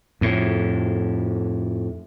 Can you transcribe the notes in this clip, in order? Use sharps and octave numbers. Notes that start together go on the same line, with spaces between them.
F2 A2